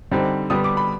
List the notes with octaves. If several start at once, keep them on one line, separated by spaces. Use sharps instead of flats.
D3 G3 C4 D#4
D3 G3 B3 D#6
D6
B5